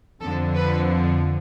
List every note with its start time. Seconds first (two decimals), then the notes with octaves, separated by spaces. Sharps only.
0.20 F2 D3 F3 A4
0.55 B4